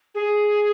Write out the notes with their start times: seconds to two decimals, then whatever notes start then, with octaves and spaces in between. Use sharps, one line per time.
0.15 G#4